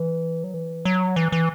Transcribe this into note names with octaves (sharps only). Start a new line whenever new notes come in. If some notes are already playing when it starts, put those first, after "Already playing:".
Already playing: E3
F#3
E3
F#3
E3
E3